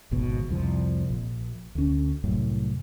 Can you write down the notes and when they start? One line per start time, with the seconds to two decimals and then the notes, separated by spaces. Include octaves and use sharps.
0.11 G#1 C#2 G#2 B2
0.49 C2 F2 F3
1.10 A#1
1.75 D2 C#4
2.24 C2 F#2 A2